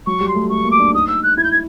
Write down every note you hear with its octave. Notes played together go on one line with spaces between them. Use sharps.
F#3 C#6
G3
C6
A3
A3 C#6
A#3
D6
D4
D#4 D#6
E6
F#6
E4 G#6
G6
G#6